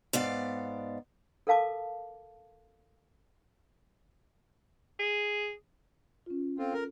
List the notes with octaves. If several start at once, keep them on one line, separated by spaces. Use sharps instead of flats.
G#2 B3 D5 F5
A4 A#4 F5 A5 D6
G#4
C#4 F4
C4 F4 A4
A#4